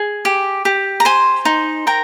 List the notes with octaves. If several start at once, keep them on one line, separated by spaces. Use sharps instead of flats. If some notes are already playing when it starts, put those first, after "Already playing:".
Already playing: G#4
G4
G4
A#5
C5 G#5 C6
D#4
A#4 G5 A#5